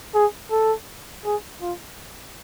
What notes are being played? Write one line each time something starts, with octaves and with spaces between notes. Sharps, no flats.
G#4
A4
G#4
F4